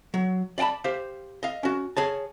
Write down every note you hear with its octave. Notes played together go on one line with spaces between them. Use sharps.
F#3
D5 F5 G5 A5 B5
G4 C5 F5
D#5 F5
C#4 F#4
G#4 C#5 A5